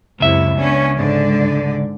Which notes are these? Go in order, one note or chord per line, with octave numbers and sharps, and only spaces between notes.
C#2 F#2 C3 E4 E5
B3 C#4 D4
G#2 D3 D5